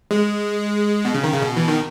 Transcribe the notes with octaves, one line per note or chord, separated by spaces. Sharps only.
G#3
B2
C#3
D#3
C#3
B2
E3
D#3